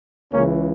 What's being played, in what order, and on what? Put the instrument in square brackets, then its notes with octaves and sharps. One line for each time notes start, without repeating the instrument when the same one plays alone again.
[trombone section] C#2 C#3 E3 A#3 C#4